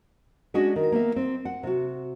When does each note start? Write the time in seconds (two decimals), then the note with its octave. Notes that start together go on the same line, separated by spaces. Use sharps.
0.54 G#3 C#4 D4 F#4 D#5
0.76 D#3
0.92 A#3 B3 E5
1.16 C4
1.45 F#5
1.63 C3 F#4